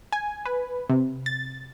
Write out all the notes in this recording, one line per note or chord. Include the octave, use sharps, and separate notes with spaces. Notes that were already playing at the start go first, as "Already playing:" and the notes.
G#5
B4
C3
A6